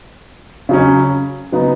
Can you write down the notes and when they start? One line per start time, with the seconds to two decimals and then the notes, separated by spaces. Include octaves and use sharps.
0.69 C#3 F#3 C#4
1.52 C#3 F#3 B3 D#4